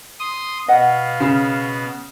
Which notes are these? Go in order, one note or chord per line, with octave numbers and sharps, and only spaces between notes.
C6 D#6
B2 D#5 F5 F#5
C#3